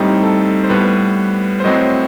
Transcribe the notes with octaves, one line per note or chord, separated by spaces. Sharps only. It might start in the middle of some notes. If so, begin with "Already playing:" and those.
Already playing: A2 G3 C4 D#4
A4
C5
A2 G3 B3 B4
C5
A2 F#3 C4 D#5